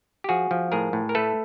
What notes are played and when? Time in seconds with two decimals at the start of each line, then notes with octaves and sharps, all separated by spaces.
0.24 G4
0.29 F3 F#4 G#4
0.51 F3
0.72 A2 G#4 A#4
0.93 A2
1.09 A#4
1.15 A3 A4 B4